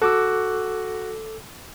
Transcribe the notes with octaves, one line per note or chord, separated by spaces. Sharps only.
F#4 A4 D6 E6